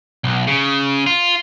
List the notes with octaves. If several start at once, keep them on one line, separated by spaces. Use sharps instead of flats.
B1
C#3
F4